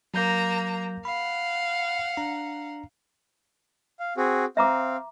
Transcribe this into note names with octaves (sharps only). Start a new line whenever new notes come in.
F#3 A#3 A#5 G6
F5 F#5 B5
D4 A#5
F5
C4 F#4 G#4
C4 E5 F5 A#5 D6